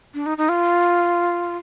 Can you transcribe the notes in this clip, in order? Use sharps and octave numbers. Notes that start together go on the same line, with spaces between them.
D4
D#4
D#4
F4